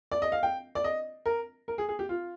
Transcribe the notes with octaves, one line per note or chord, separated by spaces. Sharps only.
D5
D#5
F5
G5
D5
D#5
A#4
A#4
G#4
G#4
G4
F4